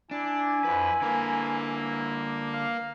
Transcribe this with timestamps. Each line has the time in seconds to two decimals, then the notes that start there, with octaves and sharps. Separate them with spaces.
0.11 D4 E4 G#5
0.65 F2 B4
1.02 D3 A#3 B4
2.53 F5